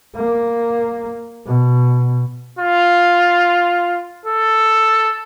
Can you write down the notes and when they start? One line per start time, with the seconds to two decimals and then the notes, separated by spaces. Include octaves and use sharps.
0.16 A#3
1.46 B2
2.59 F4
4.25 A4